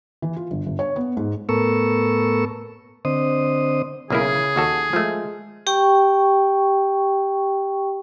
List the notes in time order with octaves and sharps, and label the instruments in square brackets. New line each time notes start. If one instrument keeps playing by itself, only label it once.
[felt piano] E3
F4
G1
G1
C#5
B3
G#2
[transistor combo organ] A2 B3 A4 A#4 C#6 E6
D3 C4 C5 D#5 D#6
[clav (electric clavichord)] B1 A#3 E4 [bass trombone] C#3 [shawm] G#4
[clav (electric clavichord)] D#2 F#4 A4
[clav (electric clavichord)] F3 A3 [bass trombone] G#3
[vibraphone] G4 G5 C#6